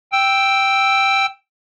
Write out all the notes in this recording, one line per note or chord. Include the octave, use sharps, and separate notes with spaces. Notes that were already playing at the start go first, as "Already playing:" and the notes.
G5 E6